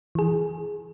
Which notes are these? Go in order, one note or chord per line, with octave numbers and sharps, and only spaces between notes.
E3 G#4